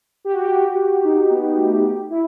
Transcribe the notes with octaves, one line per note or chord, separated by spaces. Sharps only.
G4
F#4
G4
G4
F#4
D#4
B3
A3
G4
E4